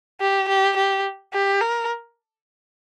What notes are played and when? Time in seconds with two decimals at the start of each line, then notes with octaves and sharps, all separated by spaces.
0.20 G4
0.48 G4
0.77 G4
1.33 G4
1.61 A#4